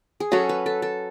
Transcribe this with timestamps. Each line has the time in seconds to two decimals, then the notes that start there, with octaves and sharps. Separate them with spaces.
0.20 G#4
0.32 F#3 C#4 F#4 A4
0.49 B4
0.66 A4
0.82 A4